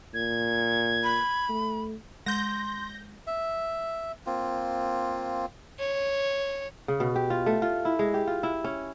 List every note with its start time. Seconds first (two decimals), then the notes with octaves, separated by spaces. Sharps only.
0.14 A#2 G#6
1.04 B5
1.49 A3
2.26 G#3 C6 G6 A#6
3.27 E5
4.26 A#3 C4 F4
5.80 C#5
6.88 C#3
7.00 B2
7.16 G4
7.30 F4
7.46 A3
7.62 F4
7.85 E4
7.99 G#3
8.14 G4
8.27 F4
8.43 E4
8.64 C#4